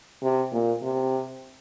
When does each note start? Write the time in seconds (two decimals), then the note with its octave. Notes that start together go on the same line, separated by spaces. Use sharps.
0.23 C3
0.52 A#2
0.82 C3